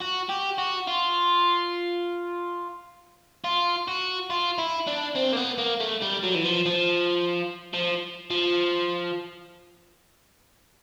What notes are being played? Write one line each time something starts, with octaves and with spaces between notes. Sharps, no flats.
F#4
G4
F#4
F4
F4
F#4
F4
E4
D4
C4
A#3
B3
A#3
A3
G3
F#3
E3
F3
F3
F3
F3